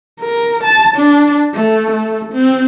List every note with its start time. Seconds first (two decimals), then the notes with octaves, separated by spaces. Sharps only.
0.21 A#4
0.64 A5
0.96 D4
1.54 A3
1.91 A3
2.32 C4